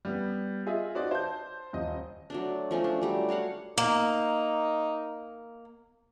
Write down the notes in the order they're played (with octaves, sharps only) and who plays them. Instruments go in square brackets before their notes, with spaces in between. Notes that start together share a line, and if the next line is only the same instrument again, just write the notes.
[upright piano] G3 B3
F4 G#4 D#5 E5
D#4 F#4 C5 D5
C5 A5 G6
D#1 D#5
[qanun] F#3 A3 D4
F3 A3 C#4 D#4
D4
F#3 G3 A3
F#4 C#5 F5 F#5
[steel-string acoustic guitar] A#3 [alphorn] D#4